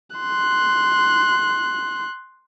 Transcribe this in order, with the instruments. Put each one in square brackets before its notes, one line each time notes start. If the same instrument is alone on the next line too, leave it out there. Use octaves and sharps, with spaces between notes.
[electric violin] C6 F#6